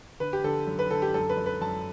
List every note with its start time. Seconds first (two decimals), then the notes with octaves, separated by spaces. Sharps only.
0.20 D3 B4
0.33 G4
0.44 D3 A4
0.67 F#2
0.79 B4
0.91 D3 A4
1.02 G4
1.14 F#2 A4
1.29 B4
1.37 F#2
1.46 B4
1.61 F#2 A5